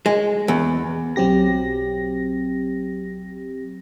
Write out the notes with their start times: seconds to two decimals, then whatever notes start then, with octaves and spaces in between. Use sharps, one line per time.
0.06 G#3
0.48 E2
1.16 B1 F#3 C4 G4 A#6